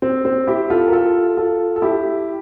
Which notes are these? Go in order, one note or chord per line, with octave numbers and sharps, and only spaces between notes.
C4
C4
E4 G4
F4 A4
A#4
F4 A4
F4 A4
A4
E4 G4